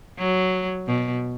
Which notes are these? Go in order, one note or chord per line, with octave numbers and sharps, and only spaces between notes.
F#3
B2